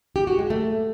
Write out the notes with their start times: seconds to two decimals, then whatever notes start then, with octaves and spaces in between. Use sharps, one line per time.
0.16 G4
0.27 F#4
0.39 G#3
0.50 A3